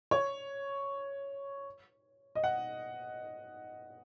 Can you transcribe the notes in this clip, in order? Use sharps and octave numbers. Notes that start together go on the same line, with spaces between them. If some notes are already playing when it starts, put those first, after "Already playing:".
C#5
D#5
F#5